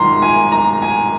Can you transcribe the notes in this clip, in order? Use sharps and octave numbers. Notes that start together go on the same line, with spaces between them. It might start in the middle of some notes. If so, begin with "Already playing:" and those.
Already playing: G#1 G2 D#3 A#5 C6
G#5
A#5
G#5